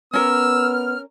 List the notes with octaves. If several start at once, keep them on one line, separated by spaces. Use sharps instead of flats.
B3 C#4 A#4 E6 F6